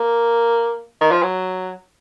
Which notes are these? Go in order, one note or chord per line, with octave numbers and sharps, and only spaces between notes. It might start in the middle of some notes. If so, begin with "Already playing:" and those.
Already playing: A#3
D#3
F3
F#3